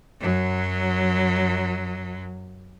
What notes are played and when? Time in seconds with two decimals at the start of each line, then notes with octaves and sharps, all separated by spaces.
0.21 F#2 F#3